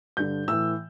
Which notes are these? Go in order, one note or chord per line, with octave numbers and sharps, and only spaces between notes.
G2 D3 G6
A2 E3 E6